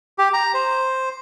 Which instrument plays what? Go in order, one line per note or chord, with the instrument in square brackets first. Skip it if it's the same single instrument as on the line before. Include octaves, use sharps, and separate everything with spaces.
[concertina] G4
A#5
C5